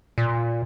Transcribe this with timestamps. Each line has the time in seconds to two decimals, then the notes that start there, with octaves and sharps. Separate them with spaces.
0.18 A#2